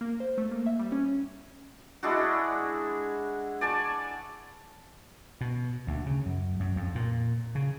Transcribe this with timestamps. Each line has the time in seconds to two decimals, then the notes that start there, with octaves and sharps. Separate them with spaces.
0.01 A#3
0.20 C5
0.38 A3
0.51 A#3
0.66 E5
0.79 G3
0.92 C#4
2.03 G#3 D4 E4 F#4
3.61 D5 G#5 A5 C#6
5.41 B2
5.87 D2
6.06 C#3
6.26 F#2
6.60 F#2
6.76 F2
6.95 A#2
7.55 C#3